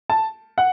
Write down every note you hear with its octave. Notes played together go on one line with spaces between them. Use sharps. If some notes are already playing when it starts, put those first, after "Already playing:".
A5
F#5